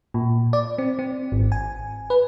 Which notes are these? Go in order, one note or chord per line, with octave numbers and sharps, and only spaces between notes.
A#2
D5
C4
C4
G#1
G#5
B4